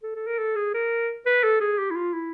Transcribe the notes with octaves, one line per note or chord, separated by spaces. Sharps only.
A4
A4
A#4
A4
G#4
A#4
B4
A4
G#4
G4
E4
F4
E4